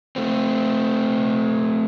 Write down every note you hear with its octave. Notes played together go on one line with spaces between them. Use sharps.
A3 C4